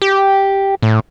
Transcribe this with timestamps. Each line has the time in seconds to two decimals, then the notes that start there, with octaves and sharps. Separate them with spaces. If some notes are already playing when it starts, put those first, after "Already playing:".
0.02 G4
0.82 A2